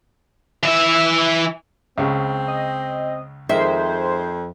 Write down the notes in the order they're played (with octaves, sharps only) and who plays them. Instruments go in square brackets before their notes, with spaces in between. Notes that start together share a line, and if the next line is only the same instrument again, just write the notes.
[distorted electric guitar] E3 E5
[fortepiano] C#2 C#3 [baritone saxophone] C4
[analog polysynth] D#5
[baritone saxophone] F2 [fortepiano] D#3 G#3 A#4 [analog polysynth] C5 [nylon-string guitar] E5